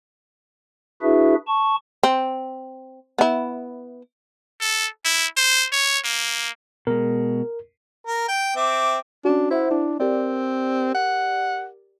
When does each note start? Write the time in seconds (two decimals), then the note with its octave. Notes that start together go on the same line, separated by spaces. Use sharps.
1.02 D4 E4 F#4 G#4 B4 E5
1.48 A5 C#6
2.03 C4
3.18 B3 E4
4.61 A4
5.05 E4
5.37 C5
5.72 C#5
6.04 A#3
6.87 B2 G#3 A#4
8.07 A#4
8.28 G5
8.56 C4 E5 D6
9.25 C#4 D4 F#4
9.51 E4 C5 E5 F#5
9.71 D4 E4
10.00 C4 G4 A#4 D5
10.95 F#5